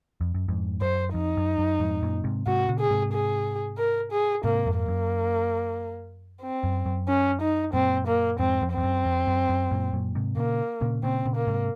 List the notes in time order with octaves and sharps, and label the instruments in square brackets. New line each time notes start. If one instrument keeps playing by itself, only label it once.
[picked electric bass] F2
F#2
F2 G#2
[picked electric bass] F#2 [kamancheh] C5
[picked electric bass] F2 [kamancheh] D#4
[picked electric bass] F#2
F#2
F2 G#2
F#2 A#2
G#2 C3
[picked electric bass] G#2 C3 [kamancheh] F#4
[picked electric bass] A#2 C#3
[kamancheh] G#4
[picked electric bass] G#2 C3
[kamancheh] G#4
A#4
G#4
[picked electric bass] G#2 C3 [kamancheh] A#3
[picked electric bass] F2 G#2
[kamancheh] A#3
[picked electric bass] F#2
[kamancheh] C4
[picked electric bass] F#2
F#2
[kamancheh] C#4
D#4
[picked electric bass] F#2 A#2 [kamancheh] C4
[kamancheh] A#3
[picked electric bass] F2 G#2 [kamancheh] C4
[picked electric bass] F2
[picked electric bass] F2 [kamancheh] C4
[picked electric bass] F#2
F2
F#2
F#2
F#2 A#2
F#2 A#2
G#2 C3
[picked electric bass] A#2 C#3 [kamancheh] A#3
[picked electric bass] A#2 C#3
[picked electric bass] A#2 C#3 [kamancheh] C4
[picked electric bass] A#2 C#3
[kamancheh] A#3
[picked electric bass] G#2 C3